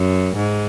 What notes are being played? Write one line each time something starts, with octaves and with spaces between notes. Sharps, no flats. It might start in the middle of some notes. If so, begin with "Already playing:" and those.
Already playing: F#2
G#2